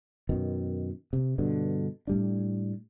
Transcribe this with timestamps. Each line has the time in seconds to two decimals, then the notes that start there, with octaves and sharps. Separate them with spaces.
0.29 F#2 B2 D#3
1.13 C3
1.38 G2 B2 D3
2.07 A2 G3 D4